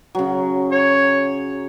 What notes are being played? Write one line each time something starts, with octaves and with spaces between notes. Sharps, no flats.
C#3 F#3
C#5